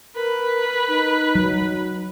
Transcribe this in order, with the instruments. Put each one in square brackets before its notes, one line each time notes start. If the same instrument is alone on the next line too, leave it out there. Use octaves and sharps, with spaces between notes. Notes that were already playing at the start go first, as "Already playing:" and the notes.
[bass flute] A#4 [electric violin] B4
[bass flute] D#4
[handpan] F#3